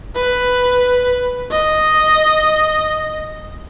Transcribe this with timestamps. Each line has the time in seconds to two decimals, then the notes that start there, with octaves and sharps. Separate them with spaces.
0.16 B4
1.51 D#5